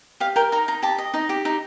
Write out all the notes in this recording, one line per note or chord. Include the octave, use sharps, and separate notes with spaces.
G4 F5
A#4 G5
D#4 A#5
D#4 A#5
G4 A5
D#5
D#4 D#5
G4
D#4